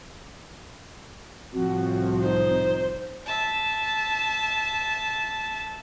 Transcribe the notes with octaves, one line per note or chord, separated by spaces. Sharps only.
C2 A2 F3 C4 F#4
D#4 C5
E5 A5